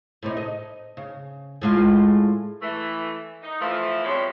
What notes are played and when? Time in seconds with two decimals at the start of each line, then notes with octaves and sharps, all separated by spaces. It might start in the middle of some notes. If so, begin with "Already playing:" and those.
0.23 A2 C3 D#4
0.37 D#5
0.97 C#3
1.62 A2 G#3 F4
2.62 E3 A3
3.42 D#4
3.60 E3 F3 A3
4.04 F2 C3 G3 G#3 B3 C#5